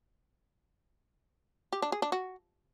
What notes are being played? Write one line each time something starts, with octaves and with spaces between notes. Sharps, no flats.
G4
D4
G#4
D4
F#4